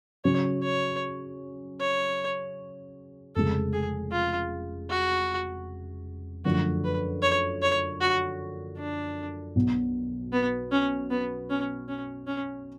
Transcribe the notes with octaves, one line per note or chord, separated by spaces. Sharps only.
C#3 F#3 C#4 C#5
C#5
C#5
F1 F2 C#3 G#3 A4
G#4
F4
F#4
F#2 D3 F3 A3 F#4
B4
C#5
C#5
F#4
D4
B1 B2 F#3
B3
C#4
B3
C#4
C#4
C#4